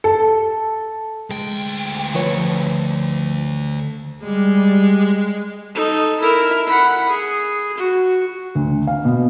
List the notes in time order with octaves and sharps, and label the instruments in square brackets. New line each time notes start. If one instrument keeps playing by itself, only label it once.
[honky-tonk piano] A4
[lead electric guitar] D2 G5 [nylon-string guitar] G#3
[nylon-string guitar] F3 B4 C#5
[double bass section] G3 [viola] G#3
[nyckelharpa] D#4 A4
E4 A#4
F#5 B5
G#4
F#4
[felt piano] D2
F5
B2